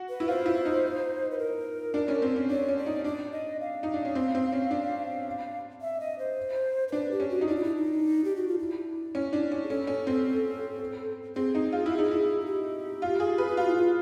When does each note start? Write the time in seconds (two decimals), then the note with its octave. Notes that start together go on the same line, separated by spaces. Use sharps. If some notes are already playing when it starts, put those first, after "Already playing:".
Already playing: F#4
0.09 B4
0.20 E4
0.28 F4 C5
0.46 E4
0.65 D#4
1.31 B4
1.38 A#4
1.94 D4
2.08 C#4
2.22 C4
2.36 C#4
2.50 D4 C#5
2.68 C#4
2.78 D5
2.86 D#4
3.04 D4 D5
3.32 D#5
3.61 F5
3.83 D#4
3.94 D4
4.05 C#4
4.15 C4
4.35 C4
4.53 C#4
4.71 D4
5.81 E5
6.00 D#5
6.19 C5
6.88 C5
6.92 D4 B4
7.11 G4
7.20 C#4
7.29 F#4
7.41 D#4
7.48 D4 E4
7.56 F4
7.63 E4
7.76 D#4
8.24 G4
8.36 F#4
8.47 F4
8.58 E4
9.15 C#4
9.33 D4
9.52 C#4
9.64 G#4
9.69 C#4 A4
9.87 C#4
10.07 C4
11.36 C4 G#4
11.55 D#4
11.72 F4
11.86 E4
11.98 D#4
12.11 E4
12.40 G#4
12.46 G4
13.02 F4
13.20 G#4
13.38 B4
13.47 F4
13.57 F4 F#4
13.67 E4
13.76 F4